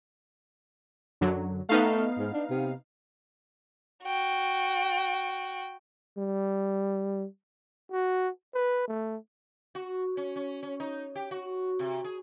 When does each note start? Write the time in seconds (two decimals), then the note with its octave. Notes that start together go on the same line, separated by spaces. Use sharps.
1.21 F#2 D3 F#3
1.69 A3 B3 D#4 F5
2.18 G#2
2.34 D4
2.50 C3
4.04 F#4 G5
6.18 G3
7.92 F#4
8.54 B4
8.88 A3
9.75 F#4
10.17 C#4
10.36 C#4
10.63 C#4
10.80 D#4
11.16 G4
11.31 F#4
11.79 C3
12.04 G#4